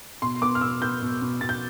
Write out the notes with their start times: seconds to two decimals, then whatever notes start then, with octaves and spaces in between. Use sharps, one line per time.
0.22 B2 C6
0.41 B3 D6
0.55 F6
0.61 B2 E6
0.82 B3 G6
1.02 B2
1.22 B2
1.41 B2 A6
1.49 G6